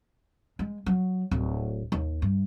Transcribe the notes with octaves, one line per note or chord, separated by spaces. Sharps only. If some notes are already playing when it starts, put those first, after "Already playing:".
G#3
F#3
D1
D#2
G2